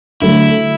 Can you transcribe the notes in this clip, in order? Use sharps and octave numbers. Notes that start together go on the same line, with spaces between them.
D3 F#3 A3 E4